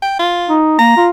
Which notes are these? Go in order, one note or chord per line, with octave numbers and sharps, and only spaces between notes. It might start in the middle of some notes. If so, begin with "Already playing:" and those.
G5
F4
D#4
A#3 A#5
F4